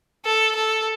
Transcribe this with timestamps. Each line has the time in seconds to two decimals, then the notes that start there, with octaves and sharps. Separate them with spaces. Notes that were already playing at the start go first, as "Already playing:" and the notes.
0.25 A4
0.55 A4